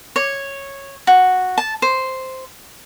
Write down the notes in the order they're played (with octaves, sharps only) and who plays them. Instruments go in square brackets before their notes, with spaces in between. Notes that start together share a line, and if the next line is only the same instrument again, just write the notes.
[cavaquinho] C#5
F#4
A5
C5